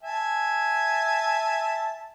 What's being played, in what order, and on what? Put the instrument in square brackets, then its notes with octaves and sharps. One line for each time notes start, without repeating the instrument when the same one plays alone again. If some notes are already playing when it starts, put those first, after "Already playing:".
[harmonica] E5 G#5 A5